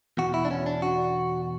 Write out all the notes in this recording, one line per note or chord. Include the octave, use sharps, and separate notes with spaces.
E2 B2 F#4
E4
D4
C#4
D4
F#4